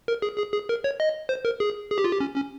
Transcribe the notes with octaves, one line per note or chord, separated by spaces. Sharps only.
A#4
G#4
G#4
G#4
A#4
C#5
D#5
C5
A#4
G#4
G#4
G4
F4
G4
C#4
C#4